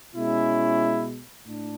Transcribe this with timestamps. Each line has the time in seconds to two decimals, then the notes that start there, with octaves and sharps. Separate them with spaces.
0.15 B2 G#3 C#4 E4
1.46 A2 D4